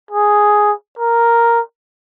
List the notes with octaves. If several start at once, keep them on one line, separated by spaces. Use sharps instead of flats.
G#4
A#4